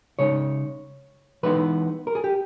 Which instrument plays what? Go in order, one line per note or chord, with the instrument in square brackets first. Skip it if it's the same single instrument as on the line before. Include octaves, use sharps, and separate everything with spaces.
[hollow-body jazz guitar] C#3 G#3 D#4 C#5
E3 G#3 B3 D#4 B4
A#4
G#4
G4